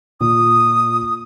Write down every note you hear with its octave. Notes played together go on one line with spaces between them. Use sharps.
A#2 D#6